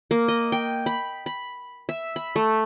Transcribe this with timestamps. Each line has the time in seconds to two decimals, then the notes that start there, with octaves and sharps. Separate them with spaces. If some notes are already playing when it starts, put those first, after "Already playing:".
0.11 A#3
0.28 D#5
0.52 G5
0.86 B5
1.26 B5
1.89 E5
2.16 B5
2.36 A3